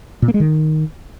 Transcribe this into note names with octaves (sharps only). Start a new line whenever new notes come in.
A#2
A#3
G#3
D#3